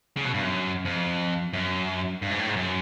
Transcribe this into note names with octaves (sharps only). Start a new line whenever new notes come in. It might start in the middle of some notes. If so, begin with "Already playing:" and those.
C#3
B2
G2
F#2
F2
F#2
G2
G#2
A2
G#2
F#2